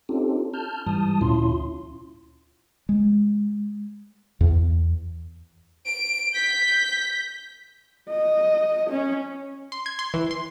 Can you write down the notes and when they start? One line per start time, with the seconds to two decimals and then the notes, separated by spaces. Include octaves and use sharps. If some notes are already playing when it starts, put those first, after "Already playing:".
0.09 C4 C#4 D#4 F4 G4 A4
0.54 A5 F6 G6
0.87 G#2 E3 G3 A5 D#6
1.21 D2 A#2 C#4 E4 F4 C6
2.89 G#3
4.41 E2
5.86 D7
6.34 G6 B6
8.10 D#5
8.90 C#4
9.72 C6
9.86 G#6
9.99 C6
10.14 E3
10.31 C6